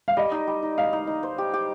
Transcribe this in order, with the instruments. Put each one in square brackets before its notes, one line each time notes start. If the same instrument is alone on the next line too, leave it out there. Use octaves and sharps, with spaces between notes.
[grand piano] F5
[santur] G3 [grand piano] D#5
[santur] D#4
G3
D#4
[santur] D#4 [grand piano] F5
[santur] D#4
D#4
C5
G4
G4